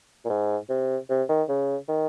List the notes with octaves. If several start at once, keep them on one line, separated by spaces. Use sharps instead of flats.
A#2
G#2
C3
C3
D#3
C#3
D#3